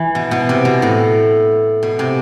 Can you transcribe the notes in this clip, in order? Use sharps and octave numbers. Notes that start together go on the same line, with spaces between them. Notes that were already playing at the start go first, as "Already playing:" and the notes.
Already playing: E3
B2
B2
C3
B2
A2
B2
C3